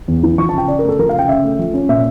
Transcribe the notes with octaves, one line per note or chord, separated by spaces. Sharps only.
E2
E3
F3 C#6
A5
C#3 G5
C#3 D5
A#4
A3 A4
F3 A#4
F5
C#3 G5
C#3 E5
A3
F3
C#4
A#2 E5